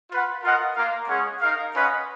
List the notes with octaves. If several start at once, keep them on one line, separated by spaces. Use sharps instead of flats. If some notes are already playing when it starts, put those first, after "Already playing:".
F4 B4 F#5
F4 A#4 D#5 F#5
A#3 F4 A#4 F5
G#3 C#4 G#4 C#5 F#5
D#4 A#4 F5
C#4 F4 B4 D#5 F#5